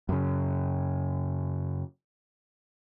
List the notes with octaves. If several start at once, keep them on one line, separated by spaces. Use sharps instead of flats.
F#2 C#3